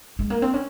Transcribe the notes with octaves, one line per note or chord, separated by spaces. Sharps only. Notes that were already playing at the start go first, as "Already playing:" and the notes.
G#3
A#3
C4
C#4